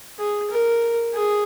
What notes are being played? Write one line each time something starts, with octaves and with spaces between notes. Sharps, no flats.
G#4
A#4
G#4